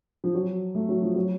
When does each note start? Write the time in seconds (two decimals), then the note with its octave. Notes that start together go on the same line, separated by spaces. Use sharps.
0.24 F3
0.35 F#3
0.75 A3
0.89 F#3
1.02 F3
1.16 F#3